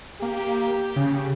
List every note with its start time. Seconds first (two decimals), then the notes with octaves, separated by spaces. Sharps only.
0.22 A#3 G4
0.96 C#3